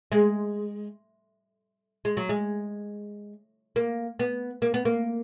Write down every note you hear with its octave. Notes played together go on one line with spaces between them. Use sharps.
G#3
G#3
F#3
G#3
A#3
B3
A#3
B3
A#3